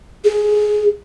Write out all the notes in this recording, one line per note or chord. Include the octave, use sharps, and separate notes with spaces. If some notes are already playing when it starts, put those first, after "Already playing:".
G#4